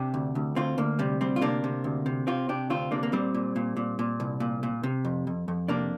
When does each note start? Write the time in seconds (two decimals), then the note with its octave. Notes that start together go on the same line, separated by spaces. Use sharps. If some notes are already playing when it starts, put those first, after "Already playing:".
Already playing: C3 D4 G4
0.14 D2
0.35 D2
0.56 D2 C4 F4
0.78 D2 A#3
0.99 C3 G3
1.21 D2 G3 C4
1.36 F4
1.42 C3 A#3 D4
1.64 C3
1.84 D2
2.06 C3
2.27 C3 C4 F4
2.49 C3 D4 G4
2.70 D2 C4 F4
2.91 C3 A#3 D4
3.03 A#3
3.12 A#2 G3 C4
3.34 A#2
3.56 A#2
3.77 A#2
3.99 A#2
4.20 C2
4.40 A#2
4.63 A#2
4.83 C3
5.05 F2
5.27 F2
5.48 F2
5.68 C3 A#3 D4